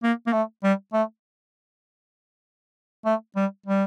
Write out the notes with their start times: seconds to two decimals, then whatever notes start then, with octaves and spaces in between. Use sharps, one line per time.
0.03 A#3
0.27 A#3
0.33 A3
0.64 G3
0.93 A3
3.05 A3
3.36 G3
3.66 G3